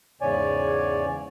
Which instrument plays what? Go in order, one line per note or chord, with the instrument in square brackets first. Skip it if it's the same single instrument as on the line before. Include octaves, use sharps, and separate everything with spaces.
[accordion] E2 G#2 C#3 C#5 D5 G#5